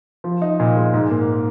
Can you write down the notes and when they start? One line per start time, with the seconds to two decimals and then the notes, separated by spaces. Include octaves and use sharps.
0.24 F3
0.42 D#4
0.60 A#2
0.77 G#3
0.93 G#2
1.10 A#3